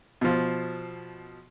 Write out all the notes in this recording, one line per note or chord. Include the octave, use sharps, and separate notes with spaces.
B2 F3